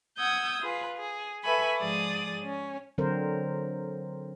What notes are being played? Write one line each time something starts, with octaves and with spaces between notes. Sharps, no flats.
F#5 D#6 E6 G6 G#6
F4 G#4 B4
G#4
A4 B4 E5 G#5 B5 C#6
G#2 F3 G#4 D5 D#6
C#4
D3 F#3 C4 A#4 C5